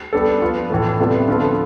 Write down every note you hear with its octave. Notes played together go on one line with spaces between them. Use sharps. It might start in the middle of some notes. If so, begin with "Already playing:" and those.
G3 B3 D4 A4
F3 B3 F4
A2 E3 A3
C3 G3 B3 F4 A4
D3 F3 B3 F4 A4